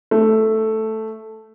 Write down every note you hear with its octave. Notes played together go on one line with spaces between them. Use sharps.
A3